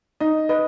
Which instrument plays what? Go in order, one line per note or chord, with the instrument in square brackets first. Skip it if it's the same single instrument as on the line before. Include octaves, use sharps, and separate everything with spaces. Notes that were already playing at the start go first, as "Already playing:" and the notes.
[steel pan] D#4 [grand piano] D#5
[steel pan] B4 [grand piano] D#5